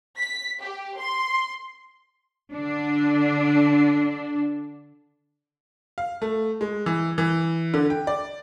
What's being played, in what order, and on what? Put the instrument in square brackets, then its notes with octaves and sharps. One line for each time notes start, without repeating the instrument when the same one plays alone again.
[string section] B6
G4
C6
[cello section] D3 D4
[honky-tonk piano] F5
A3
G#3
E3
E3
D3
G5
D5